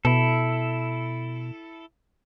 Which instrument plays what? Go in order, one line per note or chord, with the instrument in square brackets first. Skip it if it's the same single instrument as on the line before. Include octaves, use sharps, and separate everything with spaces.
[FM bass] B2 [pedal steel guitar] E4 A4